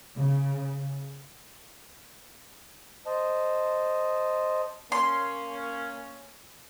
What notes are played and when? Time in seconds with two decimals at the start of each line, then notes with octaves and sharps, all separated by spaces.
0.16 C#3
3.06 C5 D#5 A5
4.92 A#3 C#4 C6